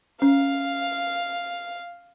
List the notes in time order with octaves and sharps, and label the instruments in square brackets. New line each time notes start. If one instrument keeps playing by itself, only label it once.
[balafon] C#4 [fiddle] F5